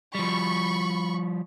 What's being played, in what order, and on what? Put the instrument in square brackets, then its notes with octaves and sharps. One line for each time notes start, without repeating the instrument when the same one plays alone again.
[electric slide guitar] F3 G3 [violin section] B5 C#6